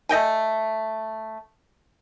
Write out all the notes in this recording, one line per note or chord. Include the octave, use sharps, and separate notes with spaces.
A3 D#5 G5 G#5